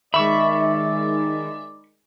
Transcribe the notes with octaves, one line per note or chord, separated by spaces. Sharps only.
D#3 G#3 D5 E5 B5 C#6